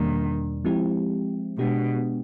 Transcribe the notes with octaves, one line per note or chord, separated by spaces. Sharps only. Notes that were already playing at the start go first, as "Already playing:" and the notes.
Already playing: E2 B2 D#3 G3 A#3 D4
F3 G#3 C4 E4 G4
B2 G#3 B3 D4 G4